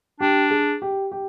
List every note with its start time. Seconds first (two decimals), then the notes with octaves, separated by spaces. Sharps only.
0.20 D4 G4
0.51 G#4
0.82 G4
1.12 G4